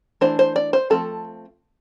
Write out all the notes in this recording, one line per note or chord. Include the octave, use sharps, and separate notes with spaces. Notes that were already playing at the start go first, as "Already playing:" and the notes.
E3 A3 D4 C5
C5
D5
C5
F3 A3 C4 A4